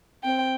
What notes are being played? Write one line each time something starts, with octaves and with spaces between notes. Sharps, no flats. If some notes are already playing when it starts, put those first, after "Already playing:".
C4 G5